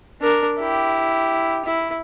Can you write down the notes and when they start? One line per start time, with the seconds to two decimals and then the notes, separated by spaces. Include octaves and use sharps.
0.21 D4 A#4
0.59 E4 G4
1.65 E4